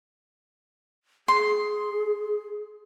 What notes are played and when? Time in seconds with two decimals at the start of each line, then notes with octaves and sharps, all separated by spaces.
1.28 G#4 C6